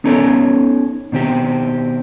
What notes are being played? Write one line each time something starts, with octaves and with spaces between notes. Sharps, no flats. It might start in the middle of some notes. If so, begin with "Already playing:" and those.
B3 C#4 D#4 A4 C#5
B2 D#3 C4 G4